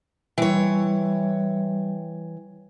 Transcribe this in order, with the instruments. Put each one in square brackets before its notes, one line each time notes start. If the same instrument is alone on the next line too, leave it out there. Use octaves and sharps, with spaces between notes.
[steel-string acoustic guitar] E3 C#5 [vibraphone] G3